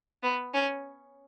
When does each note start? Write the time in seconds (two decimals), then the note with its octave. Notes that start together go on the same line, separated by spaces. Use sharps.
0.23 B3
0.54 C#4